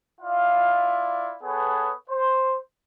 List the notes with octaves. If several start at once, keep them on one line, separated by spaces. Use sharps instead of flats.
E4 F4 D5 F5
B3 G#4 A4 B4 C#5 D#6
C5